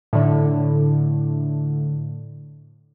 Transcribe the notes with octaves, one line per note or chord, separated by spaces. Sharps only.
A2 D3